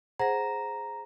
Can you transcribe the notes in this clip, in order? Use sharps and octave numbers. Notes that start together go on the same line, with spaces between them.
G#4 C5 F#5 A#5 A#6